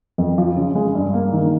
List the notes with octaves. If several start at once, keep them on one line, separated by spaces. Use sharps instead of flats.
F2
F3
C#3
G#3
G2
A#3
D#3